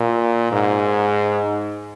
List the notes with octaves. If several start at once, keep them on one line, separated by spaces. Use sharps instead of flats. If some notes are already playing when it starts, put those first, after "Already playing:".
Already playing: A#2
G#2